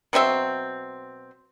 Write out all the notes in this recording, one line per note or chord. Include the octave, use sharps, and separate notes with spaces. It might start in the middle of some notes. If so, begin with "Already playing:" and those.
B2 F#3 C4 E5